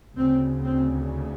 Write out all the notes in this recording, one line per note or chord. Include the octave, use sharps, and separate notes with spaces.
D2 C#3 C4
C4